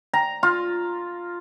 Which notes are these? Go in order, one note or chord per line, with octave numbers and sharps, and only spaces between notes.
A#5
F4